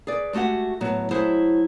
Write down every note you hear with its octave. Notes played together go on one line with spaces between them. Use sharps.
G#4 B4 D5
G#3 A3 F#4 G4 F#5
A2 F#3 B3
F#3 A3 E4 G#4 C5